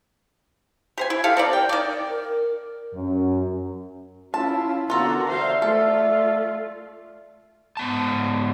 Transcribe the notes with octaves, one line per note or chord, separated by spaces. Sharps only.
G4 C5 G#5
E4
G4 A4 F5
C4 A#4 D5
G5
D#3 D5
A#4
F#2
C#4 E4 F4 A5
B2 D3 A#3 F4 F#4 A4 A#5
C5 D5 E5 F5
A3 F4 A4
G#2 B3 A5